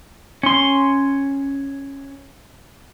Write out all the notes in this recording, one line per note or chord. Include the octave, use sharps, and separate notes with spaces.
C#4 C6